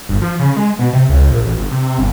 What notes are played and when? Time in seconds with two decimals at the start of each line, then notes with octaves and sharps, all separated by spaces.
0.09 G1
0.22 F3
0.39 C#3
0.56 G#3
0.79 B2
0.93 C3
1.09 C#2
1.30 A#1
1.44 A1
1.57 G1
1.71 C3
1.99 G1